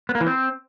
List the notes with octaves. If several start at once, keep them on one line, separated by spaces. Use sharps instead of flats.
B3
A#3
E3
C4